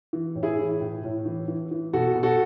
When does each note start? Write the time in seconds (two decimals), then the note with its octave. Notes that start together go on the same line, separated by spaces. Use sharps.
0.13 E3
0.35 A2
0.43 E4 G#4
0.59 E3
0.81 A2
1.04 A2
1.26 E3
1.48 E3
1.71 E3
1.93 B2 F#4 A4
2.16 B2
2.23 F#4 A4